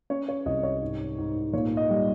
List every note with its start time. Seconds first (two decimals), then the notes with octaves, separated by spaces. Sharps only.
0.10 C#4 C#5
0.29 C#5
0.46 C2 D#5
0.63 C#5
0.82 G#2
1.18 G#2
1.53 A#2 C#5
1.77 D#5
1.90 G3